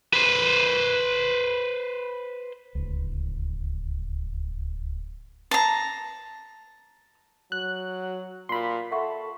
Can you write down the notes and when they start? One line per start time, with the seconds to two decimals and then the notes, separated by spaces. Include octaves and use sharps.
0.13 B4 C5
2.75 D1 C#2
5.51 A5 A#5
7.52 F#3 F#6
8.49 A#2 B5 C6
8.91 A4 E5 F#5 C#6